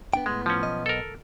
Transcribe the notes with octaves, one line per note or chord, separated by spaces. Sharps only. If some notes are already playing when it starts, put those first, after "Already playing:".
B3 D4 G5
A2 G#3 B3
F3 C#4
B1 B3 D#5
A4 A#4